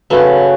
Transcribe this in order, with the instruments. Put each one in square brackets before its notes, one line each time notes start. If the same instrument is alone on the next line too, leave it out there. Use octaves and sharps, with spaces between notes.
[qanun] C#3 F#3 A3 [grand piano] B4